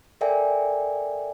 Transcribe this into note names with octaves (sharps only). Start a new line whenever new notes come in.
A4 A#4 D5 E5 G5 G#5